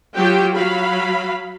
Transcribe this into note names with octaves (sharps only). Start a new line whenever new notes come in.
F#3 F4 G4 G5
F#3 F5 B5